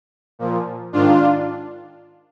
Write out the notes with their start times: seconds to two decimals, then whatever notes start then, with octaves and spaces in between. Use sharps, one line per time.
0.39 A#2 F3
0.93 G#2 D#3 D4 F4